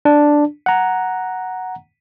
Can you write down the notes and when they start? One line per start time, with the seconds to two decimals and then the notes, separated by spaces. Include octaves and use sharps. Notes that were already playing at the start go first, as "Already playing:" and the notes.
0.05 D4
0.66 F#5 A#5